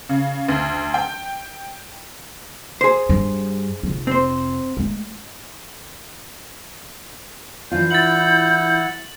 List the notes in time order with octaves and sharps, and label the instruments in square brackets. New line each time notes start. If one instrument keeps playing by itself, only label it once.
[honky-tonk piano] C#3
D2
G5
[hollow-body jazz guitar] G#4 C5
[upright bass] G2
F1 F4
[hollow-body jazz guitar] C4 C5
[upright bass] G#3 A3
[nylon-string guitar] E3 D4 F4 [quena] G6
[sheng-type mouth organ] E4 F#5 [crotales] A6 F#7